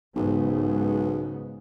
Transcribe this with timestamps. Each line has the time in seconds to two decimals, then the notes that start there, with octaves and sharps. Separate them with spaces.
0.16 B1 G#2 C#3 B3